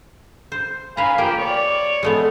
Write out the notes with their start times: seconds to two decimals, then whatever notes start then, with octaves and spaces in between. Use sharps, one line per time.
0.52 C5
0.97 B4 F5 G#5 A#5 B5
1.18 F3 A#3 G4 G5
1.39 C#5 D5
2.03 G#3 A3 B3